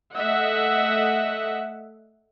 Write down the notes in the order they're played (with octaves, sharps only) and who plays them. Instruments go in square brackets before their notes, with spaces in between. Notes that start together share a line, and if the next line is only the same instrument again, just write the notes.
[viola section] A3 D#5 E5 F#5